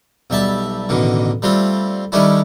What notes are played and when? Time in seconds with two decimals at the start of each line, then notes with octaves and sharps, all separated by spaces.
0.30 B1 G3 E5 A5
0.89 A1 B2 D3 D#3
1.42 G3 A3 C4 F4
2.12 D#3 G3 A3 C#4 D4 E4